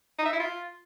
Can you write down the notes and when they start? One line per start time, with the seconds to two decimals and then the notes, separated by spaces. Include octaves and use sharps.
0.18 D#4
0.25 E5
0.33 E4
0.40 F4